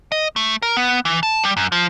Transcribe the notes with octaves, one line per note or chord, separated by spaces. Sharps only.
D#5
A3
A#4
B3
E3
A5
G3
F#2
F3